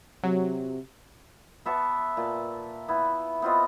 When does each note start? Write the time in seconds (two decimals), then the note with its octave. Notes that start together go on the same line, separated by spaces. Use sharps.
0.23 C3 F#3
1.65 B3 E5 A5 C#6
2.17 A#2 A5
2.88 B3 E4
3.42 B3 C4 F4 D#5